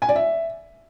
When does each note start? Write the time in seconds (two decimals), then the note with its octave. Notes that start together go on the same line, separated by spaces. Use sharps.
0.02 G#5
0.09 D5
0.16 E5